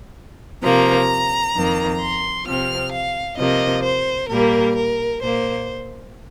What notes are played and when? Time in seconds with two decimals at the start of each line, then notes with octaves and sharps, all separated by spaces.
0.63 C3 F3 A#3 A#5
1.55 F2 D#3 A#3
2.00 C6
2.46 C3 F3 C4 F6
2.92 F5
3.38 C3 F3 A#3 D#5
3.84 C5
4.29 A#2 G3 A#3 A#4
4.76 A#4
5.21 A#2 A#3 C5